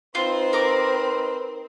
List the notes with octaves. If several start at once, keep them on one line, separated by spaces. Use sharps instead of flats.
C4 D#4 F4 B4 C6
A#4 D6